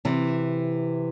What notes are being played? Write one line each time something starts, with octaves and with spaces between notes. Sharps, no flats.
C3 E3